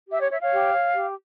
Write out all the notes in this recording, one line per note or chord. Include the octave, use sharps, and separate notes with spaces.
G4 E5
C#5
C#5 E5
C#5 F5
G4
C#5
G4